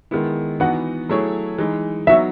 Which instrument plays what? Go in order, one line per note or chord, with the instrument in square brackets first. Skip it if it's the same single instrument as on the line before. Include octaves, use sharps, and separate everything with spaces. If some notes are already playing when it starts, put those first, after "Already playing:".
[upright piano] D#3 G#3 B3 E4
[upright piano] E3 B3 D#4 F#4 [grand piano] F#5
[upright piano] F#3 A3 E4 G#4 C#5
E3 G#3 D#4
[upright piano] F#3 B3 D#4 F#4 C#5 [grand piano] E5